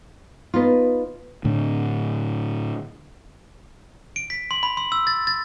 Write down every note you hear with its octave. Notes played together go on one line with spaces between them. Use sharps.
B3 D#4 F4
A2 D3
D7
B6
C6
B5
C6
E6
A6
A6